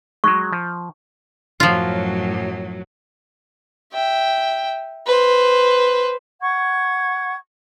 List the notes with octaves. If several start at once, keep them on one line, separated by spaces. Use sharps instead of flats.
F#3 G#3 C#6
F3
F#2 A2 F3 F#3 F4
E5 G5
B4 C5
F#5 C#6 G#6